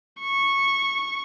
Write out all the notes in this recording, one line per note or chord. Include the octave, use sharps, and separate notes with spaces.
C#6